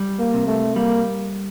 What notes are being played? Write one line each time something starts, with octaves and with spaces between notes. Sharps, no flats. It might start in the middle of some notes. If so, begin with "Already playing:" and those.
Already playing: G3
A#3
C3
A3
G3 A#3